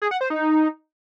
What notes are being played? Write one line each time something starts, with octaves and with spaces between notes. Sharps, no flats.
G#4
F#5
C5
D#4